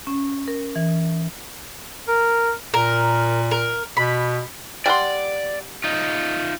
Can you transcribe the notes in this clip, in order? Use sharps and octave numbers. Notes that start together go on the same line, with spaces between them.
C#4
A#4
E3
A#4
A#2 A#4
A#4
B2 B5
G3 D5 F#5 C6
D#4 F4